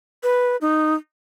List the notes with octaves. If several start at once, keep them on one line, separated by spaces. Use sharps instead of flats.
B4
D#4